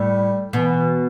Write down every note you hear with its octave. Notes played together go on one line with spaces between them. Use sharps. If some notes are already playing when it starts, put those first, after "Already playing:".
Already playing: A2 G3
B2 E3